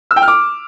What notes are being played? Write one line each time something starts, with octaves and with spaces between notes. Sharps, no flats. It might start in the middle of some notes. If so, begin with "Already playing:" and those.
E6
G5
F6
D6